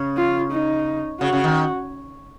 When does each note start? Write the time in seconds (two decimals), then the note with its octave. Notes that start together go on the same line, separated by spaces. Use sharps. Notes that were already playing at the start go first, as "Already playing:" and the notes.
Already playing: C#3
0.17 F4
0.52 D#4
1.21 C#3 F#4
1.33 C#3
1.44 D#3